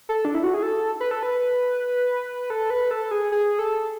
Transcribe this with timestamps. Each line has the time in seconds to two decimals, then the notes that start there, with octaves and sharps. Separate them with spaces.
0.09 A4
0.25 D4
0.35 E4
0.43 F#4
0.54 G#4
0.63 A4
1.00 B4
1.11 A4
1.23 B4
2.50 A4
2.70 B4
2.91 A4
3.11 G#4
3.32 G#4
3.59 A4